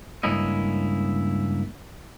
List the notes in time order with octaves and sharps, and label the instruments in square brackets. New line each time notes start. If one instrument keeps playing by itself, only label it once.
[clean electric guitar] C#2 G2 A#3 C#4 E4 D#5